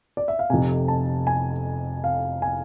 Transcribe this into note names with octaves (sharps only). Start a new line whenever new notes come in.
D5
E5
F5
F1 F2 C3 G#5
A5
G#5
F5
G#5